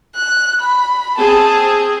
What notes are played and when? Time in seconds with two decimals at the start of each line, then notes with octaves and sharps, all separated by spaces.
0.16 F#6
0.61 B5
1.18 C4 G#4 A5